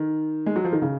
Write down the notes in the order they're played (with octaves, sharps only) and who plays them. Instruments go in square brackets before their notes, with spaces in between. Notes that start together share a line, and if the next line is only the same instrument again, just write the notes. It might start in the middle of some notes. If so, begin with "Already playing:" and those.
Already playing: [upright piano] D#3
G#3
F#3
F3
D#3
C#3